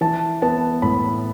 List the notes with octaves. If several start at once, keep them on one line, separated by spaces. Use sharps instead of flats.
E3 A5
B3 A5
A2 B5